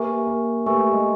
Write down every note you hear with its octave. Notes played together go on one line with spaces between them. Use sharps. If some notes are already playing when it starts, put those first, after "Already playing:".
Already playing: A#3 G4 B4 E5 G#5 C#6
A#3
A3 G4 B4 E5 G#5 C#6
G#3